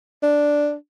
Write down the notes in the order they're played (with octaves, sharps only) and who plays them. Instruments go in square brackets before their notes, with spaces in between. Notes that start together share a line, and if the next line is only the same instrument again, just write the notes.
[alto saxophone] D4